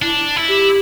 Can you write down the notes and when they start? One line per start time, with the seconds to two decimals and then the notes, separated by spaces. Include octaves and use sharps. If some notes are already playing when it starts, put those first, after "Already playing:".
0.02 D4 E4
0.36 E4
0.48 G4